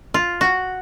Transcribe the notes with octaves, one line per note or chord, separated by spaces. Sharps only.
F4
F#4